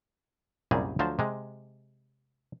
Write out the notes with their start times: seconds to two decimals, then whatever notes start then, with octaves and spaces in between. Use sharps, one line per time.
0.71 C2 F#2 A#2 F#3 G3 G#4
0.99 D2 F3 F#3 C5 A5
1.19 C3 G#3